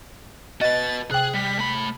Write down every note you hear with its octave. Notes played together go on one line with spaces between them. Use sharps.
F#4 B4 D#5 A6
C3 G#4 G5 F#6
G3 B6
A3 B5